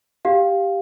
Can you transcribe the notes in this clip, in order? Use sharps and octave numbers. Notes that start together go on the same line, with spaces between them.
G4 F5